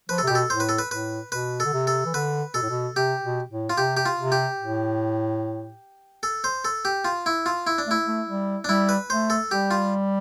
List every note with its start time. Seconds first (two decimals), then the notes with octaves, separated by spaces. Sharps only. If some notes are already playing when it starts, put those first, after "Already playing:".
0.09 F3 B4
0.18 A4
0.23 C3
0.28 B2 G4
0.35 A4
0.50 A2 C5
0.60 B4
0.69 A4
0.79 B4
0.91 A2 B4
1.32 B2 B4
1.60 A4
1.65 D3
1.73 C3
1.87 A4
2.05 E3
2.14 D3 B4
2.54 B2 A4
2.62 A2
2.69 B2
2.96 C3 G4
3.23 B2
3.50 A2
3.70 F4
3.78 C3 G4
3.97 G4
4.06 F4
4.19 C3
4.32 G4
4.60 A2
6.23 A4
6.44 C5
6.65 A4
6.85 G4
7.05 F4
7.26 E4
7.46 F4
7.67 E4
7.78 D4
7.87 A3 E4
8.07 A3
8.28 G3
8.64 D4
8.69 G3 E4
8.89 B4
9.10 A3 C5
9.30 A4
9.51 G3 G4
9.71 F4